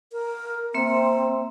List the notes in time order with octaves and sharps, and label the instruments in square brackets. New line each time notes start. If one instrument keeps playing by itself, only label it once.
[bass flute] A#4
[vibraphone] A#3 E5 C6 [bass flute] C4